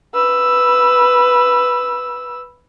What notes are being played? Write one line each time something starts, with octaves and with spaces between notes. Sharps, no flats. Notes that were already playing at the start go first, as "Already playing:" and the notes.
B4 E6